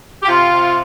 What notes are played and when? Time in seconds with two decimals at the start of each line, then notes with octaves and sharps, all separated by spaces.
0.23 G4
0.27 C3 F4
0.52 C3